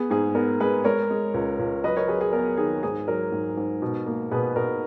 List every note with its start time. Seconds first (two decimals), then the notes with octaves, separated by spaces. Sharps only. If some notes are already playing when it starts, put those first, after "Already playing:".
Already playing: B3 G#4
0.10 G#2 G#4
0.35 B3 A#4
0.60 G#3 G#4 B4
0.84 G#3 A#4 C#5
1.10 G#3
1.34 C#2
1.59 C#2
1.84 F#3 B4 D#5
1.97 A#4 C#5
2.08 F#3 G#4 B4
2.21 G#4
2.33 B3 A#4
2.57 D#3 G#4
2.83 G#2 G#4
3.08 F#3 A#4
3.32 G#2
3.57 G#2
3.82 B2
4.07 A#3
4.31 B2 G#4 B4
4.56 B2 A#4